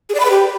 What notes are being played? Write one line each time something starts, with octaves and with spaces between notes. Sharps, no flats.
G#4
D5
B5
B4
G4